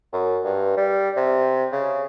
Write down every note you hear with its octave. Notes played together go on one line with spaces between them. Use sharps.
F#2
G2
G3
C3
C#3